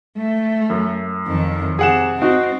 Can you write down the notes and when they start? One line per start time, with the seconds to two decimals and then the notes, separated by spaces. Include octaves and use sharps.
0.17 A3
0.70 F#2
1.26 F2 D#3
1.79 C3 G#4 F#5 E7
2.22 C4 D#4 F#4